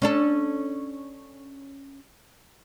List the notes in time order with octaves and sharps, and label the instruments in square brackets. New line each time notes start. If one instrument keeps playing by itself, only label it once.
[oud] C#4 D4 A4